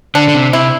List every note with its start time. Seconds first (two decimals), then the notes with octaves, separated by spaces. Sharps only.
0.15 D3 D4
0.28 D3
0.34 C3
0.53 C3 E4